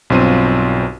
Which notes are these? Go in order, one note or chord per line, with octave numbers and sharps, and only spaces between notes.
B1 G2 C4 F4 D#7